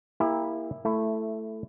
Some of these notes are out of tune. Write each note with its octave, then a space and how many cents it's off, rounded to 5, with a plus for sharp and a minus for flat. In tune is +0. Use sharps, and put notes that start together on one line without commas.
A#3 +0 E4 -5 G4 +40
A3 +0 E4 +15